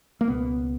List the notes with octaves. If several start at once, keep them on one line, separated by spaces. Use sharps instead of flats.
A#3
C#2 B2 B3